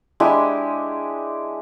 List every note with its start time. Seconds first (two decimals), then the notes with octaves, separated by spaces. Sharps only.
0.20 G#3 D4 E4 G4